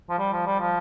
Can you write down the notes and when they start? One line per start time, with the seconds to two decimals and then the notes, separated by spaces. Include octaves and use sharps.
0.10 F3
0.19 G3
0.33 F3
0.46 G3
0.60 F3